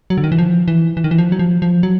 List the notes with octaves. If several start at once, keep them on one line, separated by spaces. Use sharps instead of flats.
F#3
D3
D#3
E3
F3
E3
E3
D#3
E3
F3
F#3
F3
F3
F#3